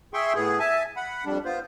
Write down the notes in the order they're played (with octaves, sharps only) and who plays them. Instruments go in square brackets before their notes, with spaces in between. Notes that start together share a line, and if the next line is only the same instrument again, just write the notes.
[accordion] G#4 E5 G5 C6 C#6
A2 B3 G#4
E5 G#5 A5
F#5 B5
F2 G3 D4
B3 F4 C5